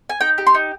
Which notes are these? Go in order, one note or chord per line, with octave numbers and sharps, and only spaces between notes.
G#5
D#4 G5
G4
C6
D#4